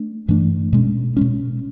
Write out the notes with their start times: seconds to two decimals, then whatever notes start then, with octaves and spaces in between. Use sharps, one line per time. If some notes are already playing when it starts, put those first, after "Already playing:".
Already playing: A3 D4
0.28 G2 E3 A3 D4
0.73 B2 G#3 C#4
1.17 B2 G#3 C#4